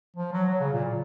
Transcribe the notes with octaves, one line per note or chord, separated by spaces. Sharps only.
F3
F#3
F#3
C#3
A#2